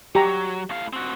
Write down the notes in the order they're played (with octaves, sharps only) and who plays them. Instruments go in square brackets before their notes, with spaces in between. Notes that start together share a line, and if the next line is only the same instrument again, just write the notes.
[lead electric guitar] F#3 [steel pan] G4 A#5
[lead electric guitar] A2 F5
C4 F#4